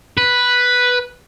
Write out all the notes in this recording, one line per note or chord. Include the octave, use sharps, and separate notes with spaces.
B4